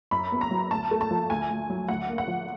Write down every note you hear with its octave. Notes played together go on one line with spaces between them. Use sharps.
F#2 B5
B3
A#5
F#3
D2 A5
A3
A5
F3
D2 G#5
D2
F#3
D2 F#5
A#3
F#5
F3